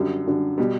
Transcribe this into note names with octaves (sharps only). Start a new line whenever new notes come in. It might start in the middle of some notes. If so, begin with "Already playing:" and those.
Already playing: F#2 D3 G3
F#2 D3 G3
B2 G3